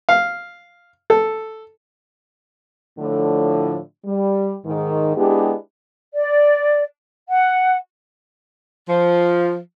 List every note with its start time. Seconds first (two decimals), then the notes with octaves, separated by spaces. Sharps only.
0.09 F5
1.10 A4
2.99 A2 D3 F3
4.05 G3
4.66 G#2 D#3
5.17 G#3 B3 D4 E4 G4
6.13 D5
7.29 F#5
8.89 F3